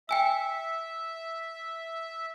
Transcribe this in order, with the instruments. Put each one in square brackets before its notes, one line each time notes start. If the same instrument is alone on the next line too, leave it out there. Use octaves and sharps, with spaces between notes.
[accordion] E5 [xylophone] G5 G#5 E6